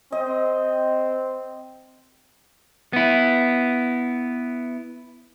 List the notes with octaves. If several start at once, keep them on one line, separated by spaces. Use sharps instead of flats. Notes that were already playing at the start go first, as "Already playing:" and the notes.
C4 D#5
B3 E4